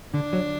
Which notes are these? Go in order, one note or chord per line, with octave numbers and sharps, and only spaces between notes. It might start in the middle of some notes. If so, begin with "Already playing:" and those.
D3 D4
F#3